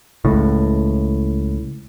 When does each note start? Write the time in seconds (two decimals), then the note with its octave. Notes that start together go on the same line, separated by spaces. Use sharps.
0.25 C#2 A2